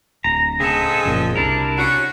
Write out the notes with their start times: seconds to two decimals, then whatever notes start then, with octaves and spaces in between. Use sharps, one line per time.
0.24 D1 A#5
0.60 C#3 G#3 C4 G#4 A4
1.05 F#1 A#2 C#3 F3
1.36 C2 D4 E4 A#4
1.77 C#4 F#4